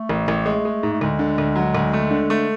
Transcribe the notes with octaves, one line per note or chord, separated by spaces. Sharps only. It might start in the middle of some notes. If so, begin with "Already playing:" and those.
Already playing: A3
A1
A1
G#3
G#3
G#2
A3
D2 G#3
D3
D2
F#3
D2
A3
D3
A3